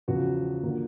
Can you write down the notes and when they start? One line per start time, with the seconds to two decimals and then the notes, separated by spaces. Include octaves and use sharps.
0.08 E2 C#3 F3 F#4
0.63 D3 F3 A#3 D4